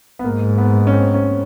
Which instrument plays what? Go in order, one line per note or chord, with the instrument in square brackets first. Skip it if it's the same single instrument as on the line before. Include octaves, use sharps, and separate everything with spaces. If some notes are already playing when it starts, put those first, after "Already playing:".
[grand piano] B3
[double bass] G#2 [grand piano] A#3
[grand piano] B3
C#4
C4
C#4